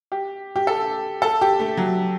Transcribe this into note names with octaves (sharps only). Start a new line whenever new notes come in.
G4
G4
A4
A4
G4
A3
F#3